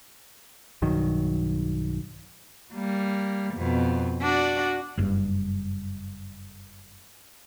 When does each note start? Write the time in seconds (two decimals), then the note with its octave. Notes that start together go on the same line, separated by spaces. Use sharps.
0.82 B1 G2 D#3 F#3
2.73 G3 A#3
3.55 F2 B2
4.21 D4 F#4 D5
4.97 F#1 G2